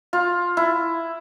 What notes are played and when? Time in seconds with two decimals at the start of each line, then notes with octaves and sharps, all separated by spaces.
0.13 F4
0.57 E4